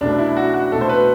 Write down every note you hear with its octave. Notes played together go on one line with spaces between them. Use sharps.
C2 B2 A3 D4
E4
F#4
F#4
C2 B2 A3 A4
C5
B4